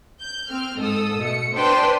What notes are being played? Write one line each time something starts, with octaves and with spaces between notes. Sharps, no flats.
G6
C4 F6
G#2 A4 D#6 E6
B2 A3 C#7
D4 B4 C5 G5 A5 C6